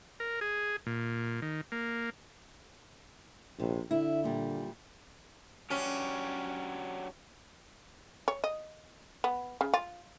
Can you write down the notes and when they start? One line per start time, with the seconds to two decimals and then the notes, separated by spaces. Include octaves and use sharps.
0.20 A#4
0.41 G#4
0.87 A#2
1.42 D#3
1.72 A#3
3.60 A#1 C3
3.91 D3 E4
4.24 A#2 G3
5.70 F#3 C#4 D4 G4
8.28 C#5
8.44 D#5
9.24 B3
9.61 C#3
9.74 F4